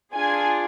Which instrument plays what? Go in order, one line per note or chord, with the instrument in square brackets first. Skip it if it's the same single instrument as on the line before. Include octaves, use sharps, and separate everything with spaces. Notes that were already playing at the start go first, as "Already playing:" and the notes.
[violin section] D4 F4 G#4 G#5